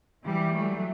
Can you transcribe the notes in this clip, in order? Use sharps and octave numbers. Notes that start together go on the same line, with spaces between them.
E3 G3
F#3 A3